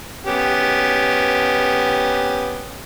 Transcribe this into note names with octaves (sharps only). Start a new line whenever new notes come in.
B3 C#4 G4